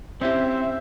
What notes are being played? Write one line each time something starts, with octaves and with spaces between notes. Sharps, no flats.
C4 C#4 E4 G4 C5 E5